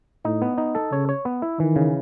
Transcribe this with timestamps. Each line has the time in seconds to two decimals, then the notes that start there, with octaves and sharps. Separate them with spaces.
0.25 A2 D#4
0.42 B3
0.58 D#4
0.75 A4
0.92 C#3 C#5
1.09 C#5
1.25 B3
1.42 E4
1.59 D#3 E3
1.76 C#3